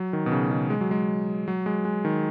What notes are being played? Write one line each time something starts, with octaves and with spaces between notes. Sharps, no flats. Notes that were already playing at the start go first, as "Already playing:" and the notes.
Already playing: F#3
D#3
B2
C#3
C#3
G#3
F#3
G#3
F#3
G#3
G#3
D#3